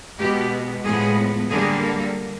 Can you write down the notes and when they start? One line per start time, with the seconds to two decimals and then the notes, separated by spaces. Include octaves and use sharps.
0.18 B2 G#3 B3 G4
0.84 A2 F3 G#3 B3 G#4
1.50 D3 G3 A#3 G#4
1.83 A4